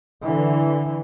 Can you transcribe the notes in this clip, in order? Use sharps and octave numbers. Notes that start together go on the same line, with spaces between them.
D3 E3